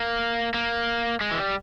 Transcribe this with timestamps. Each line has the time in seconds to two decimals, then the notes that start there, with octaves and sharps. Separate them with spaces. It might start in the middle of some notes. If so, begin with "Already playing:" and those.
Already playing: A#3
0.54 A#3
1.21 G#3
1.31 E3
1.39 G3